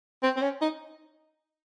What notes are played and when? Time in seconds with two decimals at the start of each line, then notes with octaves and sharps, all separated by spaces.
0.23 C4
0.37 C4
0.42 C#4
0.61 D#4